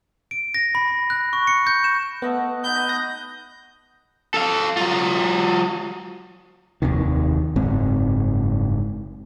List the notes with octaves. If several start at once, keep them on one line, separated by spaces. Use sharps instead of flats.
D7
A#6
B5
B5
F#6
C#6
C#7
G6
E7
A3 B3 D#5 F#5
B3 D#4 G6
D#5
F#6 A#6
A4 F5
F#3 F4
F1 D#2 C3 D#3
F#1 G#2 C4